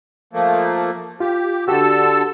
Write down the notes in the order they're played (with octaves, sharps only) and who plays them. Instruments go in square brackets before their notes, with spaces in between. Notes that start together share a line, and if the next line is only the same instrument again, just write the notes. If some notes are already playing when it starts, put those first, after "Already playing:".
[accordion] F3 A3 A#3
[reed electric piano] F4 [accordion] G4
[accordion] D3 A4 E6 [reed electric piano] F#4 G4